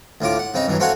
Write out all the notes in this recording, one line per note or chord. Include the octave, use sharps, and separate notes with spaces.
D2 A2 F4 D6
F#5
C#3 C4 D#4
G2 E3 F#3
A3 C4 F#4 F5 F#5 G#5